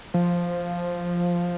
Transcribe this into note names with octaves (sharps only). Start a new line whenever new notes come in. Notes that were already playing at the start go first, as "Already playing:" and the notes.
F3